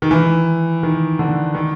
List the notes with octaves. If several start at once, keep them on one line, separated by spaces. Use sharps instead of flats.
D#3
E3
D#3
D3
D#3